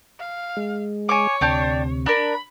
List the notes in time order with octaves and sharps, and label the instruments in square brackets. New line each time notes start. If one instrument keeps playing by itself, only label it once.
[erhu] F5
[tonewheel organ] G#3
[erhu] C#5 [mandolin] G#5 D6
[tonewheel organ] D2 C3 [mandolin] D4 G4 A5
[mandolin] D4 A#4 [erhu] B5